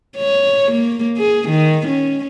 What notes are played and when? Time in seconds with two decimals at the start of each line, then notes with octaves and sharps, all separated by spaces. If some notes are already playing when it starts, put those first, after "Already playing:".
0.17 C#5
0.72 A#3
1.17 G#4
1.49 D#3
1.88 C#4